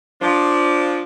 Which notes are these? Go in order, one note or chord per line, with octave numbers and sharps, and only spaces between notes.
F3 D4